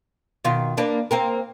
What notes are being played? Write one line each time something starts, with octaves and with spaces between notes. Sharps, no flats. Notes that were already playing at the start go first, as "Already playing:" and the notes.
B2 D#3 F4
A#3 D4 B4
A#3 C4 A#4